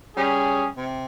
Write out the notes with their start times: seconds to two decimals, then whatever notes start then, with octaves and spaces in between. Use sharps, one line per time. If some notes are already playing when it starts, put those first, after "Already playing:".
0.16 G3 C#4 G#4
0.77 C3